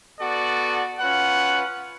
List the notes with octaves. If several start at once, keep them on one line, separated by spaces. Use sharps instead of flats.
B3 F#4 A4 D5
C#4 F4 B4 F#5